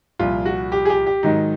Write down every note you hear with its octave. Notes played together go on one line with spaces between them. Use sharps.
C2 A#2 F3 F4
F#4
G4
G#4
G4
G4
G#2 D#3 F#3 D#4